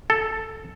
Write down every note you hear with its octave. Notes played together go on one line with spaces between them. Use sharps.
A4